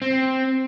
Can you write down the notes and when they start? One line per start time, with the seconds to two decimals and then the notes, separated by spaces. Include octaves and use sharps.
0.02 C4